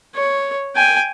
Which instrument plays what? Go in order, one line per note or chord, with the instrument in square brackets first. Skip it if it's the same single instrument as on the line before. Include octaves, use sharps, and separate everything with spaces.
[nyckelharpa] C#5
G5 G#5